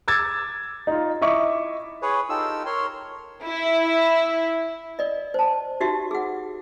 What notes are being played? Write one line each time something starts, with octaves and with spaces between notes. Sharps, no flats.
D6 E6 G#6 A6
D#4 F4
E4 D#5 E5 C#6 D6
G#4 B4 C#5
D#4 F4 G4 A4 E6
A#4 C#5 C6
E4
D5 D#5
C5 A5
D#4 F#4 G4 E5
G#4 F#5